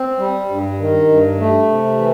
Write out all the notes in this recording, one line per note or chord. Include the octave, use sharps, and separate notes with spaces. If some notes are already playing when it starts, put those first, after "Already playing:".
Already playing: C4
G3
G2
D#3
G2
A3
C3
E3